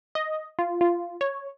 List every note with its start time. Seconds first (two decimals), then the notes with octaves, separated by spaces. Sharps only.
0.15 D#5
0.59 F4
0.81 F4
1.21 C#5